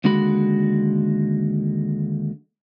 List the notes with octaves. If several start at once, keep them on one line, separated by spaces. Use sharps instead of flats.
D#2 D3 G#3 F#4 B5